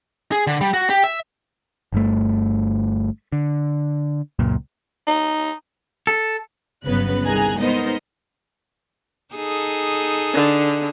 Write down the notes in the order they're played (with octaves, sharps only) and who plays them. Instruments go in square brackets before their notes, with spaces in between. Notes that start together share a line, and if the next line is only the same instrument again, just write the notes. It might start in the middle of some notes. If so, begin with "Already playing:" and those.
[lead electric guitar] G#4
D3
G3
F#4
G4
E5
[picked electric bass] G1 G2 A3
D3
C#2 F#2 A#2
[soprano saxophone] D#4
[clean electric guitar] A4
[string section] G1 C#3 F#3 B3 B4 F#6
C2 D#3 G#4 G#5 A#5 F#6
G#3 B3 D#4 A#4 C5 D#5
[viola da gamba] D#4 G#4 A4
[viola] D3